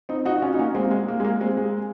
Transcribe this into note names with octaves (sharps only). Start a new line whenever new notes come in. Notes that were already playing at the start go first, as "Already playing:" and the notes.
C4 D#4
D#4 F#4
F#4
C#4 F4
D#4
A#3 C#4
G#3 C4
A#3
G#3
A#3
G#3
A#3
G#3 C4
G#3